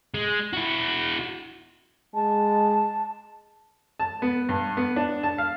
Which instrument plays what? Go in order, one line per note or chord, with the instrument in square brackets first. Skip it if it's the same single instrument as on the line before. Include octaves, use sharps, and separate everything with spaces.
[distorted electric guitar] G#3
E4 F#4
[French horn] G#3 [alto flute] A5
[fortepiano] A5
B3
G2
B3
D4
A5
F5